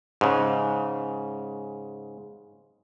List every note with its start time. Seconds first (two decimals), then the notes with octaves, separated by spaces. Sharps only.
0.21 G#2 C#3